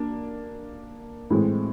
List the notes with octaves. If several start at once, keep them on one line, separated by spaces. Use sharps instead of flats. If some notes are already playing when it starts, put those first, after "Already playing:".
Already playing: A#3 D4
A2 E3 G#3 C4